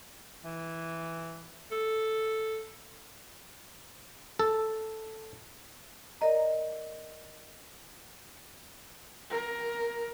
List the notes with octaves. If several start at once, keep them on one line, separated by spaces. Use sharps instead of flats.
E3
A4
A4
A#4 D5 D#5 A#5
A#4